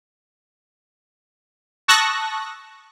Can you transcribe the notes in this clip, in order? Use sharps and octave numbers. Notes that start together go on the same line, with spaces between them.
A5 C#6 D#6 E6 F#6 A#6